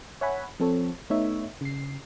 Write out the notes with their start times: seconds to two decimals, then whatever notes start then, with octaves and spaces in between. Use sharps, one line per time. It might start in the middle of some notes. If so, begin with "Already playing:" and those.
0.21 C#5 E5 F#5 G#5 B5
0.60 F3 C4 A4 C#5
1.10 A3 B3 D#4 C#5 E5
1.61 C#3 C7